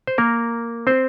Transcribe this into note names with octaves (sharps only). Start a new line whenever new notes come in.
C5
A#3 A#4
C4 C5